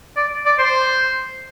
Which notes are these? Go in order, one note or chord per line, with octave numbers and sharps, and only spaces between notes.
D5
D5
C5